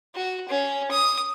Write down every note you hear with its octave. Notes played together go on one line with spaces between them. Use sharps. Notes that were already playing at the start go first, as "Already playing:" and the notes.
F#4
C#4
D#6